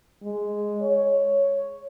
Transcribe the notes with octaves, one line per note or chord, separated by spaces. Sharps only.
G#3
C#5